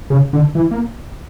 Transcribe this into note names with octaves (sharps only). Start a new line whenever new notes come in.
C#3
D3
E3
A#3